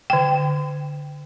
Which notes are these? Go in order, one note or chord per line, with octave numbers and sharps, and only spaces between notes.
D3 G5